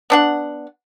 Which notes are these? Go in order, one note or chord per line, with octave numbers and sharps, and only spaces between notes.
B3 D4 F#5